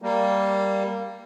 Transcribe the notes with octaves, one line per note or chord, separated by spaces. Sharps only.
G3 A#3